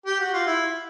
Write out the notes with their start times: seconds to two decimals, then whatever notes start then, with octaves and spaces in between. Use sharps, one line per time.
0.06 G4
0.20 F#4
0.33 F4
0.47 E4